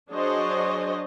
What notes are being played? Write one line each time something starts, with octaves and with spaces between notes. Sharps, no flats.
F#3 D4 G#4 C5 C#5 D#5